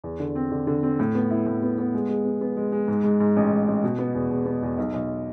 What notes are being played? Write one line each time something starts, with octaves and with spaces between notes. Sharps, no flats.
E2
D3
C4
D3
D3
C4
A2
B3
E4
A2
B3
B3
G#3
G#3
B3
B3
G#3
G#3
G#2
G#2
G#2
A1
G#2
A1
B2
B3
E2
E2
B3
E2
B1
B1